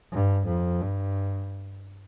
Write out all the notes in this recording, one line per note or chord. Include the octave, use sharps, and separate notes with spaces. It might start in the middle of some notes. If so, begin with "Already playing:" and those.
G2
F2
G2